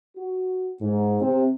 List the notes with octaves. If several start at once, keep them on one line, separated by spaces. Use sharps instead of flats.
F#4
G#2
C3